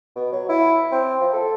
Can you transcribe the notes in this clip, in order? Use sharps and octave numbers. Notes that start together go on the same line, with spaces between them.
B2
F#3
E4
C4
F3
A4